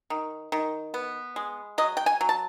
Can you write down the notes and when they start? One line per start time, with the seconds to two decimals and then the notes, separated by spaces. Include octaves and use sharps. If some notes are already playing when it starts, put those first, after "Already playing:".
0.10 D#3
0.52 D#3
0.94 B3
1.36 G#3
1.78 F#3 D#5
1.97 G5
2.06 G#5
2.21 F#3
2.29 A5